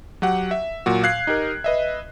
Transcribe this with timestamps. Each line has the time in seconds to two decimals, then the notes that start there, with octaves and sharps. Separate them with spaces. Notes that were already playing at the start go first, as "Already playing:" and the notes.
0.22 F#3 G4 F#5
0.51 E5
0.86 A#2 F#3 F#4
1.03 F5 F#6 G#6 C7
1.27 D#4 G4 A#4
1.64 B4 D#5 E5